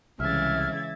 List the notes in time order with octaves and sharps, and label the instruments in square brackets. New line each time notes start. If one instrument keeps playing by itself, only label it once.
[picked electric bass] C2 [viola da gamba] C#3 E3 G#3 [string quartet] E5 G#6 A6 [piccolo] F6